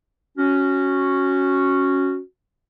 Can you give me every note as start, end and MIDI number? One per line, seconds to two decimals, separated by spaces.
0.37 2.18 61
0.37 2.18 66